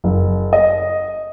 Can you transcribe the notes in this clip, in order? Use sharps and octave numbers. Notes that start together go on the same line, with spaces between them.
F#1
D#5